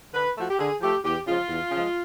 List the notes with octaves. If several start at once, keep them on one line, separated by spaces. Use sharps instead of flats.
D3 B4
F3 A3 F#4
G4
D3 G#4
F3 A3 G4
E2 G4
C#3 F3 G#3 F4
E2
C#3 F3 G#3